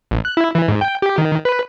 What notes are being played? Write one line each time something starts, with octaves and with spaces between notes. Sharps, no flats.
A1
F#6
E4
E3
G#2
G5
G4
D#3
B4